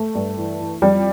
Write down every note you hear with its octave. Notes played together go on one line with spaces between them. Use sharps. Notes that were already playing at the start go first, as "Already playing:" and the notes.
Already playing: A3
G2
E3
E3
F2 G3